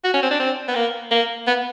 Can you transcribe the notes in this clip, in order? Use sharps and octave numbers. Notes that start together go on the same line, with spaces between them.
F#4
C#4
C4
D4
C4
B3
A#3
A#3
B3